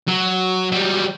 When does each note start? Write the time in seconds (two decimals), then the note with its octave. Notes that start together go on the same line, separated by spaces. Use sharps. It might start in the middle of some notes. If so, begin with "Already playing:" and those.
0.08 F#3
0.72 F#3 G3